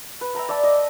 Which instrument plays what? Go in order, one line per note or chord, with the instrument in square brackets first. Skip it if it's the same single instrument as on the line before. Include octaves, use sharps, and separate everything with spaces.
[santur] B4
E5 G5 A#5 B5
D5 E5 A5 D6
D#5